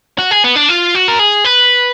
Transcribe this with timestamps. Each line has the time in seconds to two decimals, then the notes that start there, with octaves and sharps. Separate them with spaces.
0.19 F#4
0.31 G#4
0.44 B3
0.56 D4
0.69 F4
0.95 F#4
1.08 A#4
1.19 G#4
1.45 B4